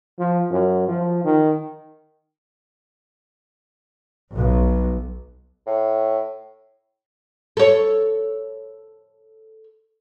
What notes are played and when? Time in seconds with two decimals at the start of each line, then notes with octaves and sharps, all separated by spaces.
0.19 F3
0.51 F#2
0.88 F3
1.24 D#3
4.34 B1
5.67 A2
7.57 A4 C#5